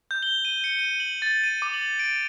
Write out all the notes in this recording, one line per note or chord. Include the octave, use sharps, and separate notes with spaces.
G6
G7
D#7
C#7
D#7
F#7
A6
D#7
D6
F#7
D7